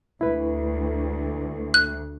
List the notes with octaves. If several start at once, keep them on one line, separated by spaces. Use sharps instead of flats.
D2 E4 B4
F#6